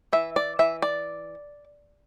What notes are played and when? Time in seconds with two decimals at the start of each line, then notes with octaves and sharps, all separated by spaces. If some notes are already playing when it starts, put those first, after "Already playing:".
0.13 E3 E5
0.36 D5
0.59 E3 E5
0.82 D5